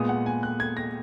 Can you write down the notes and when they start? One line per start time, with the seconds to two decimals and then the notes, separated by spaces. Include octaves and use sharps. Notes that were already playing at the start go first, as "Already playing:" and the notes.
Already playing: A#2 G#3 B3 D#6
0.09 F#5
0.26 G#5
0.43 F#6
0.60 G#6
0.77 A#6